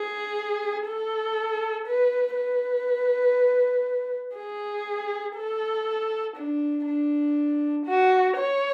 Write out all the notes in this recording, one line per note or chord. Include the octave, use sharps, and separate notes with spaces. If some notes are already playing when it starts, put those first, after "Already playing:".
Already playing: G#4
A4
B4
B4
G#4
A4
D4
D4
F#4
C#5